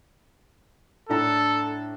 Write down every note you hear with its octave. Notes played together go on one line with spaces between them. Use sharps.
A2 D4 A4 A#5